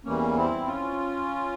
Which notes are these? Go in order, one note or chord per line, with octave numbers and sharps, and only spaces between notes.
E2 E3 G3 A#3 C#4
C4 E4
C#4 F4